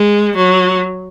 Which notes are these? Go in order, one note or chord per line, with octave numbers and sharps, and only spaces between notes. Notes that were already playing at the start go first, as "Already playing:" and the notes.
Already playing: G#3
F#3